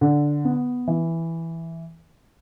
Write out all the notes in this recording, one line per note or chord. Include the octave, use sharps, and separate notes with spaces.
D3
B3
E3